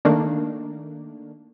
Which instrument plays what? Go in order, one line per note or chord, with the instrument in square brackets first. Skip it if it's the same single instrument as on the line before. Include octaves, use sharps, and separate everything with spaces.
[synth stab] D#3 A3 A#3 D4